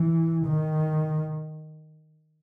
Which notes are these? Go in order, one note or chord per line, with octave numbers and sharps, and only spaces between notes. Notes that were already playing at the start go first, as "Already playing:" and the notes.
Already playing: E3
D#3